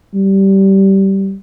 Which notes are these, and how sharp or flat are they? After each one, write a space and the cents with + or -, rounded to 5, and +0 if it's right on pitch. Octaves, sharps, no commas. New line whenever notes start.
G3 -15